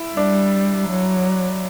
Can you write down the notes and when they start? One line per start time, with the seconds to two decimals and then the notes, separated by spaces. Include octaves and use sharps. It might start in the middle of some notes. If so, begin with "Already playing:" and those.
Already playing: E4
0.17 G3 D4
0.89 F#3